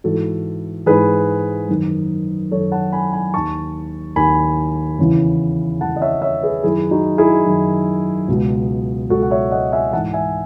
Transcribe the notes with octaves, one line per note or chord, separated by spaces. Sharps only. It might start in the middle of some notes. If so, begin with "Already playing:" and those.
G#2 E3 F#4 A4
G#2 E3 G#4 B4
F#2 D#3
F#2 D#3 A4 C#5
F#5 A5
G#5 B5
G#5 B5
D#2 D#3 A5 C#6
D#2 D#3 G#5 B5
E2 C#3 E3
E2 C#3 E3 F#5 A5
D#5
C#5 E5
C#5 E5
G#4 B4
F#2 D#3 E4 G#4
D#4 F#4
E4 G#4
F#2 D#3
C#2 B2
C#2 B2 F#4 A4
F#5
C#5 E5
D#5 F#5
E5 G#5
G#2 E3 F#5 A5
E5 G#5